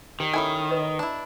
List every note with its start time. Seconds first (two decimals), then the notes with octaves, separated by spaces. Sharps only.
0.20 D#3 G4 D5
0.33 C#4 E4 A4 G#5
0.71 B4 D#5
0.99 D4 E4 A#5